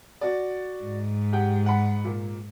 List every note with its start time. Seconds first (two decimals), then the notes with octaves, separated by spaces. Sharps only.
0.21 F#4 D5
0.83 G#2
1.32 G4 F#5 G5
1.66 F#5 B5
2.05 A#2